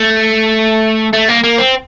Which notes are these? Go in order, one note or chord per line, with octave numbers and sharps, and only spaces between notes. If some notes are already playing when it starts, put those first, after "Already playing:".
Already playing: A3
A3
A#3
A#3
C4